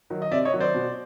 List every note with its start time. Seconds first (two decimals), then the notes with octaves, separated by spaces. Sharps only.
0.10 D#3 F#3
0.22 D#5
0.31 C3 D5 E5
0.45 C#5 D#5
0.53 D#3 F#3
0.60 C5 D5
0.74 B2